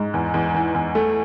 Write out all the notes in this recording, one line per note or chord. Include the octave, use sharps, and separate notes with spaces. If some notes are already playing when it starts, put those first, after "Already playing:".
Already playing: G#2
E2
E2
E3
E2
A3